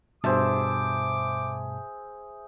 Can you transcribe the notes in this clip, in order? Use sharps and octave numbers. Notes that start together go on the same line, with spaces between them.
G2 B2 G#4 C5 E5 A5 D6